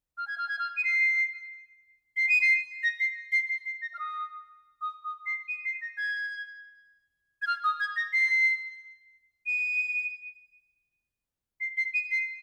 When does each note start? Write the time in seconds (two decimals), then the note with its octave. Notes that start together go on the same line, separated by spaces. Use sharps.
0.18 F6
0.28 G#6
0.38 F6
0.49 G#6
0.59 F6
0.77 D#7
0.84 C7
2.17 C7
2.29 D#7
2.41 C7
2.83 A#6
3.00 C7
3.32 C7
3.49 C7
3.65 C7
3.82 A#6
3.94 F6
3.99 D#6
4.81 D#6
5.04 D#6
5.26 C7
5.48 D#7
5.65 C7
5.82 A#6
5.97 G#6
7.42 G#6
7.47 F6
7.64 D#6
7.80 G#6
7.96 A#6
8.13 C7
9.46 D#7
11.61 C7
11.77 C7
11.94 D#7
12.11 C7